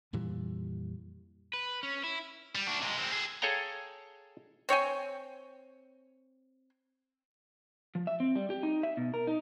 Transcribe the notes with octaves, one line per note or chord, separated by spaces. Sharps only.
F2 A#2 E3 G3
B4
C#4
E4
G3
D4 F#4
C3 G#3
G#3 C4
G#4 A4
G#4 A4 C#5 F5 G5 A#5
C4 C#5 G5 G#5
F3
E5
C4
G3
G4
D#4
E5
B2
A#4
D#4